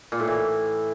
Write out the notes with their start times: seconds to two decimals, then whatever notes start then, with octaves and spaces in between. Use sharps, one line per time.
0.12 A#2
0.20 A2
0.27 E3